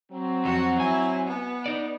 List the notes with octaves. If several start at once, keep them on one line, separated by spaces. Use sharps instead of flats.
F#3 C4
F2 F#4
E4 G#5
B3
D#4 D5